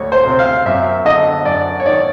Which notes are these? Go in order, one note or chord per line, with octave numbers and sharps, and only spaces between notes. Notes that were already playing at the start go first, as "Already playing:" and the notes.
Already playing: D2 C#5
C5
C3
F5
F#2 E5
D3 D#5
F#2 D5
C#5
D#3 D5